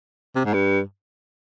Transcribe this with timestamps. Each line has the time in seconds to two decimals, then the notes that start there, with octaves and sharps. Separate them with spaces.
0.35 C3
0.45 G#2
0.53 G2